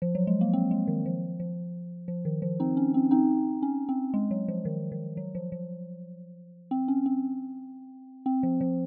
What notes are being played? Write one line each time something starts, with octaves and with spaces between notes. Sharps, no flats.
F3
F#3
G#3
A#3
C4
G#3
D#3
F3
F3
F3
D#3
F3
C4 D#4
C#4
C4
C4 D#4
C#4
C4
G#3
F#3
F3
D#3
D#3
F#3
F3
F3
C4
C#4
C4
C4
F3
F3